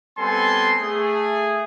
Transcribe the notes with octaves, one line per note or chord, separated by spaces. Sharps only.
G3 B3 C4 A4 G#5 C6
A3 G#4